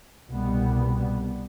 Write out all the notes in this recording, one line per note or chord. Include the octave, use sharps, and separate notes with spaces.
C2 B2 G3 B3